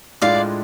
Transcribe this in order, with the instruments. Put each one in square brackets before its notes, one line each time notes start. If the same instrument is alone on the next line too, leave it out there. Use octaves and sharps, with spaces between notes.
[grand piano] A2 G#3 D4 F4 [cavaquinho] D5 F5